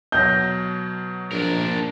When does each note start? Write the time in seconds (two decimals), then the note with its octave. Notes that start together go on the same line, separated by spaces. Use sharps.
0.12 B2 F#3 G6 A#6
1.32 A#1 D4 A#4